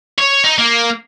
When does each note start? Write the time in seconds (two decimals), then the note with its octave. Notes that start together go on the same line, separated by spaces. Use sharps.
0.18 C#5
0.44 D#4
0.58 A#3